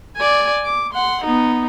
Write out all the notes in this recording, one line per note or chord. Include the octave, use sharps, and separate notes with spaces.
D5 G#5
D6
F#5 C6
B3 D#4